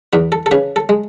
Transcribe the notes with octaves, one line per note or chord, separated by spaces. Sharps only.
E2 B4
A4
A4
C#3 B4
A4
G#3